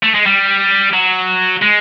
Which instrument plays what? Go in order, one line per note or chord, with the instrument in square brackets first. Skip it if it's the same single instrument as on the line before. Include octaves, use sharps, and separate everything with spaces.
[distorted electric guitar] A3
G#3
G3
F#3
G#3